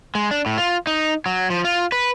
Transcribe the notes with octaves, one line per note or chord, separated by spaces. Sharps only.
G#3
D4
A2
F4
D#4
F#3
F3
F4
B4